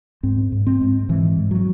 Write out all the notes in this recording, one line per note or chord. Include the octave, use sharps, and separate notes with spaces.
G#2 C4
G#2
C4
G#2
G#2 E3
G#2
F#3